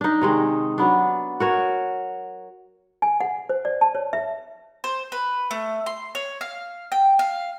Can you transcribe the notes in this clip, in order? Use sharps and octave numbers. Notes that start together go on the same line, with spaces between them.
D4 D#4
C3 D#3 G#3
F#3 B3 D4
F#4 A#4 C#5
G#5
F#5
C5
D5
A5
C#5
E5
C5
B4
A3
C6
C#5
F5
G5
F5